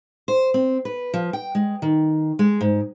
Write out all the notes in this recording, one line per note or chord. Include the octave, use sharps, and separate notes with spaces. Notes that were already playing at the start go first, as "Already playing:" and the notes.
C5
C4
B4
F3
G5
G#3
D#3
G#3
G#2